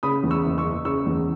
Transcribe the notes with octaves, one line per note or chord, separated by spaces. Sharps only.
C#3 B5 D#6
E2
C#6 E6
F#1
C#6 E6
F#1
C#3 C#6 E6
E2